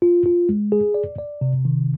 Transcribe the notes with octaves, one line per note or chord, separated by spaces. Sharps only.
F4
F4
G#3
G#4
D5
D5
C3
D#3